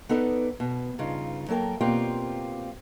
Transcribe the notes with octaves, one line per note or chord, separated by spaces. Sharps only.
B3 D#4 A4 B4 D5
B2
G2 C#3 D#4 F4
F#3 A#3 A4 A#4 G5
B2 A#3 C4 F4 G4 D5